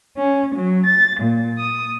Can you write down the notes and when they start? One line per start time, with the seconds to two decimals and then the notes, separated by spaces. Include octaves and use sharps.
0.16 C#4
0.53 F#3
0.84 A6
1.19 A#2
1.59 D#6